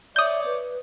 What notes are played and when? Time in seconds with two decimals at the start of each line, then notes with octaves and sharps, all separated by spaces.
0.16 C#5 D5 E5 D#6 G6
0.46 B4